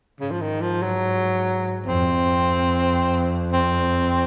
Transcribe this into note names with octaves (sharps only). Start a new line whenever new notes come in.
G#2 C#3
F3
D#3
F3
F#3
F2 C4
C4